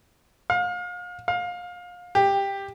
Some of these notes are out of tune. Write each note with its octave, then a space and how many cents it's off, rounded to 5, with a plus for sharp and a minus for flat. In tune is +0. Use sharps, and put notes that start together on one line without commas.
F5 +35
F5 +25
G4 +10